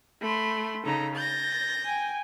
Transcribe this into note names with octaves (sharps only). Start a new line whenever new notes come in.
A3 B5 C6
C#3 D#4 A4 A#5
G6 A6 A#6
G5 G#5